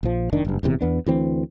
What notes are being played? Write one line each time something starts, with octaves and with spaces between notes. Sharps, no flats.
A#1 F3
F1 D#3 D4
F#1 G2
D#1 E2 C3
E2 B3 D4
D2 E3 C4